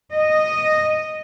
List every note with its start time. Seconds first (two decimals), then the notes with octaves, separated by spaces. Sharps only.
0.14 D#5